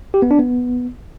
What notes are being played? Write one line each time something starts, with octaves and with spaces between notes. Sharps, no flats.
G4
B3
D4
B3